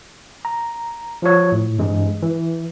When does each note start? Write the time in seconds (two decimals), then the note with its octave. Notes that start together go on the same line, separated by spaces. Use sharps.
0.45 A#5
1.22 F3 F4 C#5
1.52 A2
1.78 G2 E3 G#3
2.23 E3